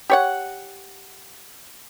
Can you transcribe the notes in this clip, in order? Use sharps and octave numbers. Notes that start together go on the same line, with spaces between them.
G4 C#5 F#5